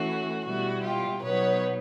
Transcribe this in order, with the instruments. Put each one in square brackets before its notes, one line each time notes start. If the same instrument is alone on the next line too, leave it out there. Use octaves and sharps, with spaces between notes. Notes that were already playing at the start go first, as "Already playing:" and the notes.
Already playing: [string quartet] E3 A3 C#4 F#4
B2 G3 B3 E4 F#4
F4 G4
B2 F#3 B3 D#4 B4 C#5